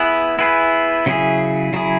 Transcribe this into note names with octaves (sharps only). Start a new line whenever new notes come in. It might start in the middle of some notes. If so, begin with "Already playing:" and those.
Already playing: B3 E4 G#4 B4
B3 E4 G#4 B4
C#3 F#3 E4 G#4
C#3 F#3 E4 G#4